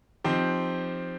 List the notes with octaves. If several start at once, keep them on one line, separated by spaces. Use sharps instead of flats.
F3 C4 D#4 G4